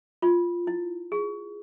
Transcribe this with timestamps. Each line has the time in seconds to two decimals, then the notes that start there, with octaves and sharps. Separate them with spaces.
0.22 F4
0.67 E4
1.12 G#4